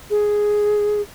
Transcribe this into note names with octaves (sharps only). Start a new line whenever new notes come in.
G#4